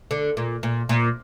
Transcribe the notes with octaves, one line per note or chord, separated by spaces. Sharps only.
D3
A#2
A#2
A#2